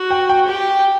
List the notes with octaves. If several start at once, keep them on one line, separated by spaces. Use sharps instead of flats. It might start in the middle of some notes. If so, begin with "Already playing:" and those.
Already playing: F#4
G5
G5
G4